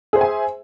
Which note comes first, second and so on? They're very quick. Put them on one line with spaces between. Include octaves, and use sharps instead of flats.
G#4 C5 E5 G#5